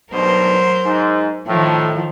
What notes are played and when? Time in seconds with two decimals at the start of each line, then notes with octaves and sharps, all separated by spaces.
0.13 B1 G2 B2 F#3 A#4 C5
0.85 G#2
1.47 A2 D#3 F3